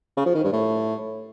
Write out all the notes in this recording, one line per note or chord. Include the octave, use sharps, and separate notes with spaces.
C#3
F3
D#3
G2
A2